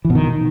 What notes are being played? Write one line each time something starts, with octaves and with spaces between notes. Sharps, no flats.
E3
B2
D#3